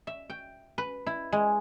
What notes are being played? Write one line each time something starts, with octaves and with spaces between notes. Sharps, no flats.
E5
G5
B4
E4
G#3